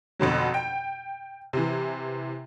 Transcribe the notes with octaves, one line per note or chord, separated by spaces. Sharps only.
F2 B2 D3 F#3
G5
C3 E3